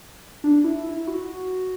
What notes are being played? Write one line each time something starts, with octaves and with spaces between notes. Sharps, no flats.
D4
E4
E4
E4
F#4